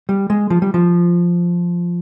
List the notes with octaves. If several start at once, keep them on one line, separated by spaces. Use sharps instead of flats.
G3
G#3
F3
G3
F3